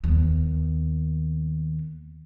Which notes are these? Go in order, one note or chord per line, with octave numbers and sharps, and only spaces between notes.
D#2 B3